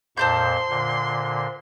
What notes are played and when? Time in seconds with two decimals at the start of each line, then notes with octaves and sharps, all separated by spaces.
0.17 F2 A#2 C5 A5 C6 G6
0.69 A#2 D3